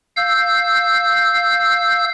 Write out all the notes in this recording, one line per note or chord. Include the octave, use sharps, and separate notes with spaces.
F5 E6 G6